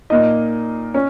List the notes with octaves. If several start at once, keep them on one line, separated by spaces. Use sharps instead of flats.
A#2 A#3 D#4 D#5
C#4